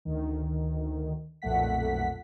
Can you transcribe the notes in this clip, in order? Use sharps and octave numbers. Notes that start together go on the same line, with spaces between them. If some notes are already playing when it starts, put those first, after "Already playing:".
D2 D#3
B1 F2 A#2 A3 F#5 B6